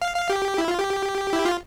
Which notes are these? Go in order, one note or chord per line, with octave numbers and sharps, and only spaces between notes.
F5
F5
G4
E4
F4
G4
E4
F4